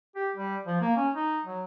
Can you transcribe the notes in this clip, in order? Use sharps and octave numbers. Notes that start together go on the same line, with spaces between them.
G4
G3
F3
A#3
C#4
D#4
F#3